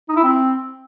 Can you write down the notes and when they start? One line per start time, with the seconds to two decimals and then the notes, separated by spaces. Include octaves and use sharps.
0.09 D#4
0.16 E4
0.24 C4